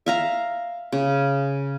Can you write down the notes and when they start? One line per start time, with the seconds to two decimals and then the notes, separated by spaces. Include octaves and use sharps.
0.06 E5 F5 A#5
0.92 C#3